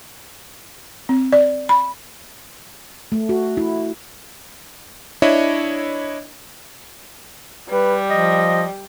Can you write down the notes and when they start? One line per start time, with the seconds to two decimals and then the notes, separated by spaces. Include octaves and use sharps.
1.09 C4
1.32 D5
1.69 B5
3.12 A3
3.29 F#4
3.57 E4
5.22 D4 E4 C#5 D#5 E5
7.69 G3 B4
8.10 F3 D#5